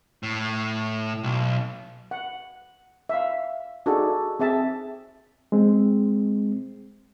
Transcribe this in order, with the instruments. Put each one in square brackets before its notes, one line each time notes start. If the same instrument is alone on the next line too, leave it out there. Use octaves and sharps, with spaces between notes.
[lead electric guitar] A2
B1
[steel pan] F#5
E5 F5
D4 D#4 F#4 G#4 A4
C4 G#4 E5 A5
[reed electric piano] G#3 C4